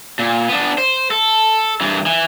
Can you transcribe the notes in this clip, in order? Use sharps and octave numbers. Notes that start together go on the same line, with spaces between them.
A#2
B3 D4
C5
A4
G2 E3
E3